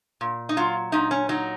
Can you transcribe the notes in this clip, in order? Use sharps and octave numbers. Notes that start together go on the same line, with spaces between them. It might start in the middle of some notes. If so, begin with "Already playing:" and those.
A#2
D#4
F#3 F4
A#2 D#4
C#4
F#3 D#4